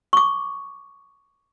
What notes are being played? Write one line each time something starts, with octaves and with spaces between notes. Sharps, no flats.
C#6 D6